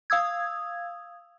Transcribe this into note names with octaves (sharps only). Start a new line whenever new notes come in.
F5 D#6 E6 G#6